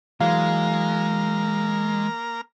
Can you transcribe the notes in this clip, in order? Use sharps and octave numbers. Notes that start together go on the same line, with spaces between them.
E3 F#3 G#3 A#3 F5 A#5 F6